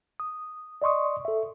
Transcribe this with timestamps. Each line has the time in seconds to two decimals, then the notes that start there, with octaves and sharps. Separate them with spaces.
0.20 D#6
0.82 D5 D#5 C6 C#6 D#6
1.25 A4 E5